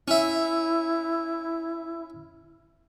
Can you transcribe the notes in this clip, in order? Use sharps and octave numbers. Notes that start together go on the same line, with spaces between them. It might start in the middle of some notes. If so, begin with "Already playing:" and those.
C#4 E4 E5